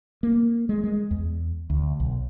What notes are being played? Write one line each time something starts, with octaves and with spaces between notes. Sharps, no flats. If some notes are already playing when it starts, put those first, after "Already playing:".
A#3
G#3
G#3
E2
D2
B1